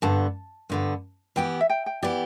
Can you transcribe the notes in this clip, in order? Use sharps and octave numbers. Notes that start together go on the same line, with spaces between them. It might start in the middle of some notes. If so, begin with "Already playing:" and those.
G2 D3 B3 A5
G2 D3 B3
E3 B3 G4 G5
E5
G5
G5
E3 B3 G4 D5